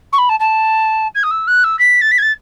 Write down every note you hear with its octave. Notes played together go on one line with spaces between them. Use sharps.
C#6
B5
A5
A5
G#6
D#6
E6
F#6
E6
B6
A6
B6
G#6
A6